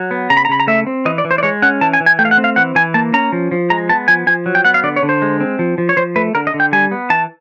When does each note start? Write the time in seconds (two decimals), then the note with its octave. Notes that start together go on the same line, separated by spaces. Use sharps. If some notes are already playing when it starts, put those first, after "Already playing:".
Already playing: F#3
0.11 B3
0.30 C#3 A#5
0.37 B5
0.45 A#5
0.49 C#3 B5
0.60 A#5
0.67 A3 E5
0.87 C4
1.05 E3 D#5
1.18 D5
1.25 E3
1.31 C5
1.38 D5
1.43 G#3 C#5
1.62 C#4 F#5
1.81 E3 A5
1.93 G#5
2.00 E3
2.06 G#5
2.19 A3 G5
2.25 F5
2.31 F#5
2.38 C4
2.44 F5
2.56 E3 F#5
2.75 E3 G#5
2.94 A#3 A5
3.13 C#4 A#5
3.32 F3
3.52 F3
3.70 G#3 A#5
3.89 B3 A5
4.08 F3 G#5
4.27 F3 G#5
4.46 F#3
4.55 G5
4.65 B3 F#5
4.74 F5
4.83 D3 D5
4.96 C#5
5.03 D3
5.09 C5
5.22 G#3
5.40 C4
5.59 F3
5.78 F3
5.89 C#5
5.97 F3 C5
6.16 A3 B4
6.35 D3 A#4
6.47 D#5
6.54 D3
6.60 G5
6.73 G3 G#5
6.91 B3
7.10 E3 A5